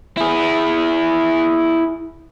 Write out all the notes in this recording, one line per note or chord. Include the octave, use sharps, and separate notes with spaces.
E4 G#4